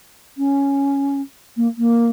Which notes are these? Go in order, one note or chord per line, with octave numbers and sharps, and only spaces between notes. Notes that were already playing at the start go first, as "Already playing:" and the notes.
C#4
A#3
A#3